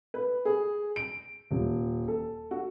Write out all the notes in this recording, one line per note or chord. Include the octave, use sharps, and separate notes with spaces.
B4
G#4
D7
D#1
A4
F#4